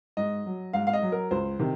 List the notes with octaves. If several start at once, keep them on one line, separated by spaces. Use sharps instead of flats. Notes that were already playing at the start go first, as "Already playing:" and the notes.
G#2 D#5
F#3
G#2 F5
F5
D#5
F#3
A#4
C#2 C5
C3 D#3